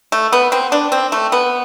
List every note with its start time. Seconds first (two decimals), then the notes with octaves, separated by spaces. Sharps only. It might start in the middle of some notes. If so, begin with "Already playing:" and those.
0.12 A3
0.32 B3
0.52 C4
0.72 D4
0.92 C4
1.12 A3
1.32 B3